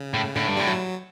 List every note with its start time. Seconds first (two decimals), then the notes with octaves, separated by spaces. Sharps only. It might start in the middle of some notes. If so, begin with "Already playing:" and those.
Already playing: C#3
0.14 A2
0.36 A2 D3
0.47 G2
0.57 A2 G3
0.67 F#3